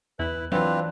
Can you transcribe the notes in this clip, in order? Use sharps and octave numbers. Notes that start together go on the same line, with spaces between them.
E2 E4 B4
E3 F#3 C4 D4 F4 B4